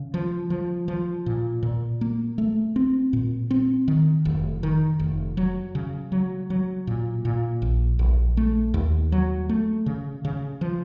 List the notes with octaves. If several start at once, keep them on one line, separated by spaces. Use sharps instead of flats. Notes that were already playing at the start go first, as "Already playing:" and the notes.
Already playing: C#3
F3
F3
F3
A#2
A#2
A#3
A3
C4
A#2
C4
D#3
F1
D#3
F1
F#3
C#3
F#3
F#3
A#2
A#2
A#1
A#1
A3
D#2
F#3
A3
C#3
C#3
F3